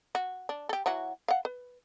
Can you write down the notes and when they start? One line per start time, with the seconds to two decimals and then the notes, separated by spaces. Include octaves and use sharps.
0.15 F#4
0.49 D4
0.69 G4 A4
0.86 E3 F#3 F#4
1.28 F5 F#5
1.45 B4